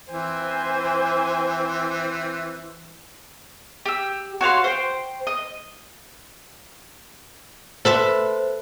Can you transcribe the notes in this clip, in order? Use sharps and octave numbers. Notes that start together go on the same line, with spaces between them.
E3 C4 C5 G#5
G4 E6
F#4 C#5 F5 C6
C5 G5
D#5
A4 B4 C5 E5 C6